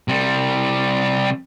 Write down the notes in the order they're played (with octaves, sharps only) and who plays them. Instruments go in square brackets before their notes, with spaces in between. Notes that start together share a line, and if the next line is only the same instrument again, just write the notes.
[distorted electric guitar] C3 G3